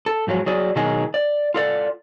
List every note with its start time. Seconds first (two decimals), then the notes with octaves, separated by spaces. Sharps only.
0.06 A4
0.27 G#2 F3 F#3 G#3
0.46 F#3 G#4 D5
0.76 B2 D#3 F#3 D#4 G#4 A#4
1.14 D5
1.54 F4 A4 D5